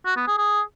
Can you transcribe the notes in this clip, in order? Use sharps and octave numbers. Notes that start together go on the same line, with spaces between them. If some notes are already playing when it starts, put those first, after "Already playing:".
F#4
B3
G#4
G#4